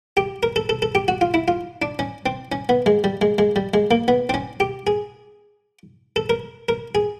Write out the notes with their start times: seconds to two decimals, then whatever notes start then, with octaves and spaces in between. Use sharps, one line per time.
0.17 G4
0.43 A#4
0.56 A4
0.69 A4
0.82 A4
0.95 G4
1.08 F#4
1.21 F4
1.34 E4
1.48 F4
1.82 D4
1.99 C#4
2.26 C4
2.52 C#4
2.69 B3
2.86 G#3
3.04 G3
3.21 G#3
3.38 G#3
3.56 G3
3.74 G#3
3.91 A#3
4.08 B3
4.29 C4
4.34 C#4
4.60 G4
4.87 G#4
6.16 A4
6.30 A#4
6.69 A#4
6.95 G#4